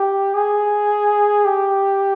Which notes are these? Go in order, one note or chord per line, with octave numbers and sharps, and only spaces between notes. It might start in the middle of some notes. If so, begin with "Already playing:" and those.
Already playing: G4
G#4
G4